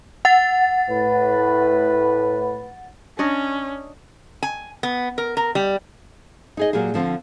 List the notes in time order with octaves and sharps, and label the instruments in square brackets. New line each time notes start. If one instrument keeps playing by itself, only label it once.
[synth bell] F#5 A6
[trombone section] A2 B4
[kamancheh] C#4 [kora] D4 C#5 D#5
[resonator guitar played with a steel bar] G#5
B3
A#4
A#4
G3
[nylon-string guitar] D#4 G#4 D#5
A#2 F#3 A#3 G4 G#4
D3 F3 C4